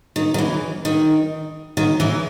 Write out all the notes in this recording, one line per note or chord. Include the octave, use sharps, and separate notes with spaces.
D#3
D#3
E3
D#3
D#3
E3